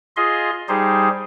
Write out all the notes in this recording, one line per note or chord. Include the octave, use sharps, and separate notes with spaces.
F4 G#4 D#5 C6
G3 D#4 G4 G#4 C5